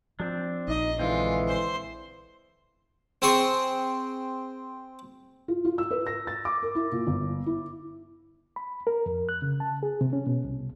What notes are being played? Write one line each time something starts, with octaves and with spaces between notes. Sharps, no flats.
F3 C4 D4
A#1 D#4 D#5
D3 E3 G#3 C4 F4
C5 C6
C4 G#4 C6 C#6
F4
F4
E6
B4
A#6
A6
D6
A#4
E4
A#2
G1
E4
B5
A#4
F2
F#6
C#3
A5
G#4
C3
C#4
B2
C2